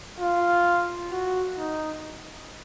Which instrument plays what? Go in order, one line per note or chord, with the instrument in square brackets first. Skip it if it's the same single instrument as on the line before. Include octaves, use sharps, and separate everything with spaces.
[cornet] F4
F#4
D#4